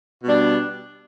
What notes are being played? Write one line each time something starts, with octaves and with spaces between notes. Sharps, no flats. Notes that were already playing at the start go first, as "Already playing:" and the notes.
B2 G3 D4